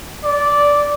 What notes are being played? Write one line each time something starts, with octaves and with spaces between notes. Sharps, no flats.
D5